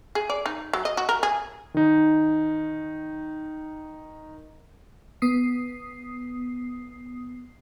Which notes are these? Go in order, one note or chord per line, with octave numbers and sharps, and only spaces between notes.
G#4
D5
D#4
F#3
D#5
F#4
A#4
G#4
D#3 D#4
B3 D#6 C7